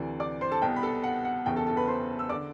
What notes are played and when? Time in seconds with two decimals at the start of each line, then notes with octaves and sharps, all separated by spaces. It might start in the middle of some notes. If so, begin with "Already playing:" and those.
Already playing: D2 C3 E3 D5
0.20 D5 D6
0.41 C5 C6
0.51 A4 A5
0.62 C2 B2 G5
0.76 B5
0.83 A4 A5
1.04 F#5
1.25 F#5
1.46 F#1 E2 B2 G5
1.56 A4 A5
1.67 A4 A5
1.77 B4 B5
1.88 C5 C6
2.19 E6
2.29 D3 D5 D6